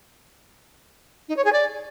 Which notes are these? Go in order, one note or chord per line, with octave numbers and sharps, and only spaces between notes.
D#4
C#5
G#4
D5